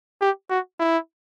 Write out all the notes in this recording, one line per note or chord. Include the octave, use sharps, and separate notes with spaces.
G4
F#4
E4